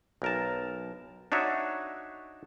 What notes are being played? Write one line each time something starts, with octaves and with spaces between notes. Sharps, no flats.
B1 A#4 A5
D4 D#4 F#4 C#5 E5